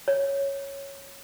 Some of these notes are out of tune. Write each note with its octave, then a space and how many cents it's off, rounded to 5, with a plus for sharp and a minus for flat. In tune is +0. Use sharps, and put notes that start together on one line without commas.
C#5 -5